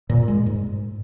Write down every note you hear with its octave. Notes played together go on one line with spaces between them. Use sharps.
A#2
G#3
G#2